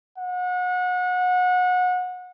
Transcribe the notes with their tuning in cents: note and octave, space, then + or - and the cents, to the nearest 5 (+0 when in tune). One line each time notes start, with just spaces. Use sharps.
F#5 -30